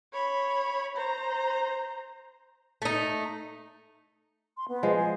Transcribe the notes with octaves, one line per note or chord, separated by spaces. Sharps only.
C#5 B5
C5 A#5
A3 D#4
C6
B3
F3 G#3
G#5